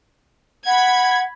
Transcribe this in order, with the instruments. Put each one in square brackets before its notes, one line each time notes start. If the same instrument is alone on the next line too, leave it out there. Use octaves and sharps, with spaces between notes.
[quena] F#5 [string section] B5 G#6